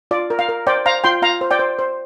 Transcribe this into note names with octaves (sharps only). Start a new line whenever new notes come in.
F4 D5
A#4
F5
A#4
C5 D5 G5
C5 F5 A#5
F4 G5 C6
F4 F5 A#5
C5
D5 G5
C5
C5